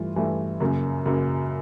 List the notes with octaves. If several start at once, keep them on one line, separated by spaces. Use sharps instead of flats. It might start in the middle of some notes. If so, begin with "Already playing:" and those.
Already playing: G2 E3 A3 F4
G2 E3 A3
F#2 C#3 F#3 A#3
F#2 C#3 F#3 A#3